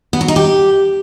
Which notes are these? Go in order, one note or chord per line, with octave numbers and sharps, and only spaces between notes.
B3
F#3
D#4
G4